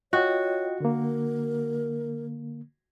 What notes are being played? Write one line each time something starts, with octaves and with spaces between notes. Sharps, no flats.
F4 F#4 C#5 D#5 G5
D3 A#3 A#4